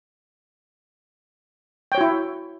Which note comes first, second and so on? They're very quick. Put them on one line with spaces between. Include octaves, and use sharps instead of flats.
G5 C#5 F#4 E4